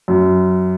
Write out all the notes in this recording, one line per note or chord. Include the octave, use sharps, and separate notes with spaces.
F#2